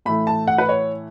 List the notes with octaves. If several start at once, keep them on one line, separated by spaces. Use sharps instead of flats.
A2 E3 A3 B5
A5
F#5
B4
C#5